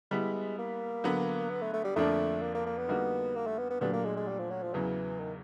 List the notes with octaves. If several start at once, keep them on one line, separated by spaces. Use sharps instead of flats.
G3 G#3 B3 E4
A#3
D3 F#3 B3
B3
A3
A3
G3
F2 D3 F3 A3 A#3 D4
A#3
A#3
A#3
B3
D3 G3 A#3 D#4 F#4
A#3
A3
B3
B3
A#2 F#3 A3 B3 D4 G4
A#3
G#3
G#3
G3
F3
F#3
F3
E2 C#3 E3 F#3
D#3